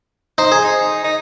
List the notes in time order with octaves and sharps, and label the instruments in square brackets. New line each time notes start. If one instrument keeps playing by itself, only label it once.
[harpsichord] D#4 [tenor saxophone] C5
[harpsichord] G#4
[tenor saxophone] D#4
D#4